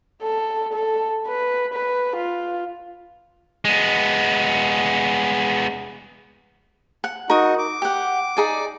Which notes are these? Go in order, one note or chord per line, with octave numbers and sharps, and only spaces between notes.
A4
A4
B4
B4
F4
G#3 B3
F#5
D#4 F#4 A#4 D#6
D6
G4 F#5
D#4 G#4 D5